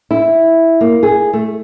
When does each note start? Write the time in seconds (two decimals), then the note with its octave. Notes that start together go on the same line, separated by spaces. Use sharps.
0.11 E4
0.81 A#3
1.03 G#4
1.33 A3